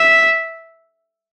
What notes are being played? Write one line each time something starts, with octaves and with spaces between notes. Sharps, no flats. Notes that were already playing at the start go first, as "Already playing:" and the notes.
Already playing: E5